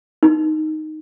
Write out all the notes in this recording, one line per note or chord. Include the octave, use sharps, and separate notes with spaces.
D#4